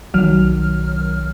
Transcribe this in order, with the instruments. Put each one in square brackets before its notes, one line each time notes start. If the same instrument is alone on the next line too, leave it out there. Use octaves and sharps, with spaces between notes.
[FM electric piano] B1 D#3 F#3 F6